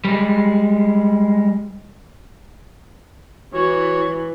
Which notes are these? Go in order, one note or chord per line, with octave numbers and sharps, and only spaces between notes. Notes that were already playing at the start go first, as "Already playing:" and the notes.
G3 G#3
E3 F#4 C#5